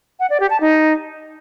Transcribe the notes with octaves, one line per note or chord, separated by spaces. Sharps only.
F#5
D5
G4
A5
D#4